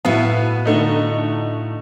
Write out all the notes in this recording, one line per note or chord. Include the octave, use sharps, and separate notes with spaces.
A2 B3 E4 F#4 F5
D3 A3 D#4